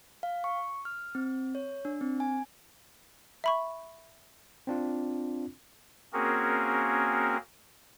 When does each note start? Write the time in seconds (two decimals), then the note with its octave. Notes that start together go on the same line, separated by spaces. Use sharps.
0.23 F5
0.44 C#6
0.85 F6
1.15 C4
1.55 C#5
1.85 D4
2.01 C4
2.20 G#5
3.44 E5 B5 C#6
4.67 C4 D4 F4
6.13 A#3 C4 C#4 F#4 G#4 A#4